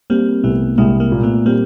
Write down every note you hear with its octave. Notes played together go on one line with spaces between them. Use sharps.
G3 A#3 C4
C2 A3 B3
C2 G#3 A#3
G#3 A#3
A#2
A3 B3
G3 A#3 C4